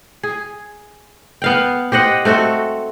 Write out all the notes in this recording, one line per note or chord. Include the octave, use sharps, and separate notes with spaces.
G#4
B3 F5 G5
G4 C5 D#5 F#5
A3 C4 F#4 A4